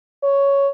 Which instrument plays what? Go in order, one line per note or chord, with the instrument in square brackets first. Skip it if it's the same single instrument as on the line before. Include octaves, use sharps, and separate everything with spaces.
[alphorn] C#5